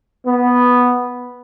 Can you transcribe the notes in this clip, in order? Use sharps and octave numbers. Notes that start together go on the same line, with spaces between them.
B3